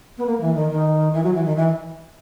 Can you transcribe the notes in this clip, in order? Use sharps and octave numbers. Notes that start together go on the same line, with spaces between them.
B3
A#3
E3
D#3
D#3
E3
F#3
E3
D#3
E3